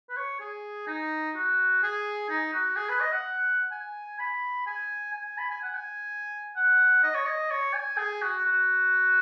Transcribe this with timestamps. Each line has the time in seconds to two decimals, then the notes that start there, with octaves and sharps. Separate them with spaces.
0.09 B4
0.17 C#5
0.40 G#4
0.87 D#4
1.35 F#4
1.83 G#4
2.30 D#4
2.53 F#4
2.77 G#4
2.89 B4
3.00 D#5
3.12 F#5
3.72 G#5
4.19 B5
4.67 G#5
5.13 G#5
5.38 B5
5.50 G#5
5.62 F#5
5.74 G#5
6.56 F#5
7.03 D#5
7.15 C#5
7.26 D#5
7.50 C#5
7.74 G#5
7.98 G#4
8.22 F#4
8.46 F#4